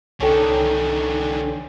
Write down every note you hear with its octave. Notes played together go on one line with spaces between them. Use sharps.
C2 D3 D#3 C#4 A4 G5